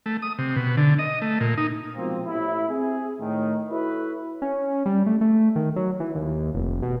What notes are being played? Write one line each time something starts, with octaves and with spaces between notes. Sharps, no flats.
A3
D#6
C3
B2
D3
D#5
A3
A#2
D#4
B2 F3 G#3 A#3 C4
A1 E4
C4 G#4
A2 D#3
E4 F#4 A4 B4 C#5 E5
C#4
G3
A3
A3
D#3
F#3
E3
D#2
F1
B2